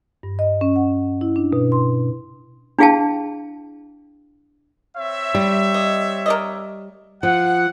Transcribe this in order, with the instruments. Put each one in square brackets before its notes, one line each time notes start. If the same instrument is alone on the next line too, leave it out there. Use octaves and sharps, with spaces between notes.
[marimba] G2
D#5
C#4
F#5
E4
D4
B2
C6
[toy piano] D4 E4 G#4 F5 G5 A5
[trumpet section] C4 C#5 E5
[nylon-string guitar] G3
[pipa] D#5
A#4 D5 D#5
[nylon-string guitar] F3 [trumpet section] F#5